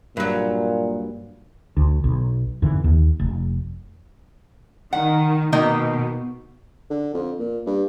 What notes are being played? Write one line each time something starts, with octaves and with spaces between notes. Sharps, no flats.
G2 A#2 F#3
D2
B1
F2 G#2 D3 E3
D#2
F1
D#3 F#5
B2 D#3 A#3 D#4
D3
F2
A#2
G2